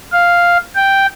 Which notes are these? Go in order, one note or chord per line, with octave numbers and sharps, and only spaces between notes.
F5
G5